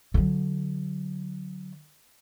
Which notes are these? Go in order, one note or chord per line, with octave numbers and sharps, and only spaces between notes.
D3 F#3